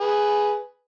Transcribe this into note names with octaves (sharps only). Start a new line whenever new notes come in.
G#4 B4